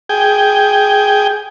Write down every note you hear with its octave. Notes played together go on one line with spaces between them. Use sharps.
G#4 G5